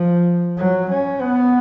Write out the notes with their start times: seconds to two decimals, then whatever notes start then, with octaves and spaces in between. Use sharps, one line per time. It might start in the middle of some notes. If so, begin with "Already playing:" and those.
Already playing: F3
0.57 F#3
0.90 C#4
1.21 B3